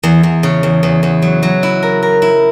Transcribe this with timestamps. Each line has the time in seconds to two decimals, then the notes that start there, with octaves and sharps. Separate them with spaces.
0.03 E2
0.23 E2
0.43 C#3
0.63 E2
0.83 E2
1.03 E2
1.22 F#3
1.43 F#3
1.63 E4
1.83 A#4
2.03 A#4
2.22 E4